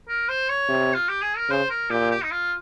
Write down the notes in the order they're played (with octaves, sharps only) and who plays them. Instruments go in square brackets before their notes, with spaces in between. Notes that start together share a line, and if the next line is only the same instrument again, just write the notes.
[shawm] A#4
C5
C#5
[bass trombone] C3
[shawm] F4
G4
G#4
A#4
[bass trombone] C#3 [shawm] C5
[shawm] A#4
[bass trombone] A#2 [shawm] G4
[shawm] G4
D#4
F4